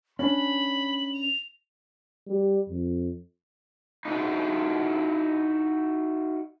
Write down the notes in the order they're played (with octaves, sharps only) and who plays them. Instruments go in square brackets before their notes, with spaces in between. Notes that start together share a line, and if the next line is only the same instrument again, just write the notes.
[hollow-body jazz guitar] C#4 D4 [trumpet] B5 [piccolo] F#7
[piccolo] F7
[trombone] G3
F2
[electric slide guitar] D#4 E4 F#4